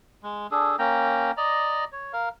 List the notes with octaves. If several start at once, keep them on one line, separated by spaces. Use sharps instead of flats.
G#3
D4 G#4 A4
A#3 C#4 G5 A#5
D5 D#5 A#5
C#5
A#4 F5